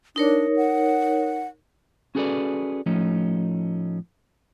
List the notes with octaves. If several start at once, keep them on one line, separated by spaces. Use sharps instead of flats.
D4 D#4 A#4 C#5
F#5
C#4 F#4 G#4 A4 B4 D5
A2 F3 A3 C#4 D#4